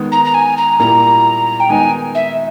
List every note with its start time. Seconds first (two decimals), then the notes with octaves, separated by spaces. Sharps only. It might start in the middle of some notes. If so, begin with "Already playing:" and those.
Already playing: D#3 G#3 B3
0.12 A#5
0.25 A#5
0.34 G#5
0.57 A#5
0.79 A#2 G3 A#3 E4 A#5
1.60 G5
1.69 D#3 G#3 B3 D#4 G#5
2.15 E5